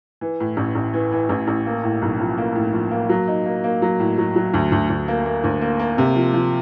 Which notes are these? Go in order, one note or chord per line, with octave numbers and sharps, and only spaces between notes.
E3
A2
A1
A1
E3
E3
A1
A1
A#3
A2
B1
F3
A#3
A2
F3
A#3
F#3
D#4
A#3
A#3
F#3
A2
F#3
F#3
D2
D2
D2
A#3
A#3
D2
A#3
A#3
C3
F3
F3